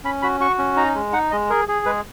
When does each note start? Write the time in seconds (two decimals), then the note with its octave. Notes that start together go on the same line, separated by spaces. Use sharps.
0.04 C#4 B5
0.22 F#4 B5
0.40 F#4 C#6
0.59 C#4
0.77 D#4 A#5
0.95 G#3
1.13 D#4 F#5
1.31 G#3 D#5
1.50 G#4 A#4
1.68 G#4
1.86 G#3 B4